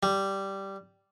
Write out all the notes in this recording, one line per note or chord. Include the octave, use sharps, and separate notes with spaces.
G3